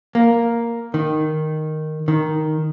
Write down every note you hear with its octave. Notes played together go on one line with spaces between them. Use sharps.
A#3
D#3
D#3